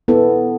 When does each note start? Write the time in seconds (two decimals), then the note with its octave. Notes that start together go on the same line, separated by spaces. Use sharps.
0.08 B3 E4 A4